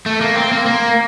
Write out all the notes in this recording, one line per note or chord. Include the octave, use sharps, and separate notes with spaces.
A3
A#3
C4
A#3
A#3